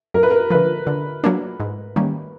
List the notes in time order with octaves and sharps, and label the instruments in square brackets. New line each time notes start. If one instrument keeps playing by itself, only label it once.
[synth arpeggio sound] F#2 [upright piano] A#4
[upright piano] B4
A#4
[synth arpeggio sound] D3 F3 [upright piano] B4
[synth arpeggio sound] D3
F#3 A#3 D4
G#2
D#3 G3 A#3 C#4